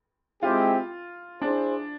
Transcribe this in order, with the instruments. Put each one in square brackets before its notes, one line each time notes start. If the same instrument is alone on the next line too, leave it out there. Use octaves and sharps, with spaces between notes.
[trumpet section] G#3 C4 E4 G4 [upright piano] F4
[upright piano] D4 [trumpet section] E4 G#4 C5